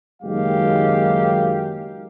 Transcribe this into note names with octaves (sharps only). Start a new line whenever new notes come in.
F#1 D#3 F#3 G#3 G4 F5